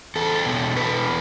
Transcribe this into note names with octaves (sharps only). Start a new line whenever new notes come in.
E2 A4
B2
E2 B4